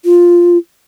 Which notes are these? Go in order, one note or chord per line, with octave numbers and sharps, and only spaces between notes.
F4